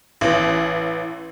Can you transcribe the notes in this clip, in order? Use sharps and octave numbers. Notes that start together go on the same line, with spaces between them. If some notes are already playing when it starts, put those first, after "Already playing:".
A1 E3